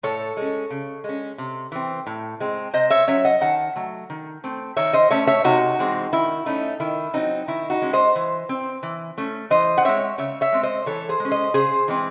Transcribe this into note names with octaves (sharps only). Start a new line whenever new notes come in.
A2 A4 C#5
G#3 C#4
C#3
G#3 C#4
C3
E3 C4
A2
G#3 C4
C3 C5 D#5
C#5 E5
F#3 C#4 C#5 E5
D#5 F#5
D#3 F#5 A5
F#3 A3
D#3
A3 C4
D#3 C#5 E5
C5 D#5
A3 C#4 C#5 E5
C#5 E5
C3 D#4 F#4
E3 G#3 C4
D#3 E4
A3 C#4 D#4
D#3 E4
F#3 C4 D#4
D#3 E4
D#4 F#4
G#3 C#4
C5 D#5
E3
C4
E3
A3 C#4
E3 C5 D#5
F#5
G#3 C4 C#5 E5
C#3 C#5 E5
C#5 E5
G#3 C4
C5 D#5
E3 A4 C#5
G#4 C5
G#3 C#4
C5 D#5
C#3 G#4 C5
E3 G#3 C4